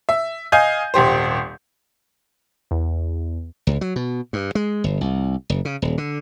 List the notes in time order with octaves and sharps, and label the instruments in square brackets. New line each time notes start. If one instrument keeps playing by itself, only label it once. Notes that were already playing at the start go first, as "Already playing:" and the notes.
[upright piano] E5
D#5 F5 G#5 G6
D#1 G#1 G4 C5
[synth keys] E2
[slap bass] C#2
F#3
B2
G2
G#3
G1
C2
F#1
C#3
D#1
D3